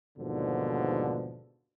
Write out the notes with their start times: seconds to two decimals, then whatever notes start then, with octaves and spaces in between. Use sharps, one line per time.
0.17 D#2 G#2 B2 D3 F3 G3